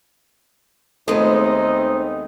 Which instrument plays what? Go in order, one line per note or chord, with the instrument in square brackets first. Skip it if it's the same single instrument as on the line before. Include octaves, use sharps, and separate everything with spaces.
[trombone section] D#2 D#4 [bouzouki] G#3 B3 [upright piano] A3 [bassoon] C4